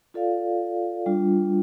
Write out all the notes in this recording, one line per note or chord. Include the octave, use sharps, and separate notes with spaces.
F4 A4 D5 F5
G3 D4 F4